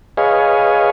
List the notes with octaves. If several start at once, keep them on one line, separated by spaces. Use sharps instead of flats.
G#4 B4 C#5 D#5 F5 G#5